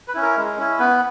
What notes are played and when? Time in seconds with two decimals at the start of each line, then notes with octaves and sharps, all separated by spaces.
0.08 B4
0.14 C#4 E4
0.22 A#4
0.37 G#3
0.58 C#4 E4
0.79 B3 B4